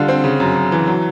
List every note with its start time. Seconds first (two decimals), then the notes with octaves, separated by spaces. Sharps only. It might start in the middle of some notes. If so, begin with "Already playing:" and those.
Already playing: D3 G3 F4
0.08 C4
0.24 C#3
0.40 F#2
0.56 F#2
0.72 E3
0.87 F#3